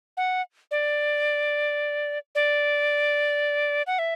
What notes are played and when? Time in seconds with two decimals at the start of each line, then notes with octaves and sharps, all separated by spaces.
0.17 F#5
0.71 D5
2.35 D5
3.87 F#5
3.99 E5